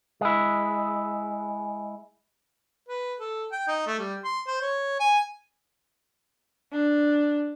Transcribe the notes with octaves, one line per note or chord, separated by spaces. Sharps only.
G#3 E4
B4
A4
G5
D#4
A3
G3
C6
C5
C#5
G#5
D4